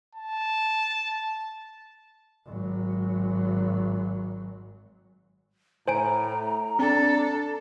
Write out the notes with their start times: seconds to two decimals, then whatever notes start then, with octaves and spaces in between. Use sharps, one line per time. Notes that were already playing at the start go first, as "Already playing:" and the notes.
0.15 A5
2.46 G#1 F#3
5.88 A2 C5 G#5 A#5 D7
6.79 C4 D4 A4